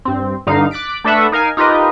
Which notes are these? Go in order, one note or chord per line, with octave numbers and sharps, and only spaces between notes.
G2 C4
G2 D3 D#4 F5
D6 F#6 A6 B6 D7
A3 D4 A4 B4 E5 F#5
D#4 A#4 F5 G#5
D#4 F4 G4 A#4 B4 D#5